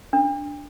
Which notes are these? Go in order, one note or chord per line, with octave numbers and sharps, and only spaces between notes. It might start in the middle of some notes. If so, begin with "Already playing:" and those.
D4